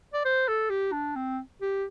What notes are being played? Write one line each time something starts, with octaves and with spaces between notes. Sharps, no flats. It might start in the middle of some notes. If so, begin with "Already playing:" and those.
D5
C5
A4
G4
D4
C4
G4